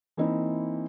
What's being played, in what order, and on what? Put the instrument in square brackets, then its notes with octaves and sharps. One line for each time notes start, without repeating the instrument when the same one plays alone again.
[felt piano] E3 A#3 C4 D#4 E4